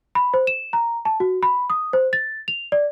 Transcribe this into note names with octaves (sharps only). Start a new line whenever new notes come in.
B5
C5
E7
A#5
A5
F#4
B5
D#6
C5
A6
F7
D5